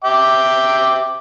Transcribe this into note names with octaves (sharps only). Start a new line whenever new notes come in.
E5 G5 D6